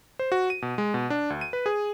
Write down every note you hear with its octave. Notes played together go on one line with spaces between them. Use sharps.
C5
F#4
D#7
B2
G#3
B2
D4
D2
D#7
B4
G#4